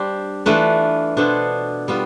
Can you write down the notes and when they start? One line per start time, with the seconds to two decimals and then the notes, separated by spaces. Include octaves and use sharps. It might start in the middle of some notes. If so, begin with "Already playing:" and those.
Already playing: G3 D4 G4 C5
0.46 E3 A3 D4 F4 B4
1.17 B2 B3 D4 A4 C5
1.88 G3 B3 F4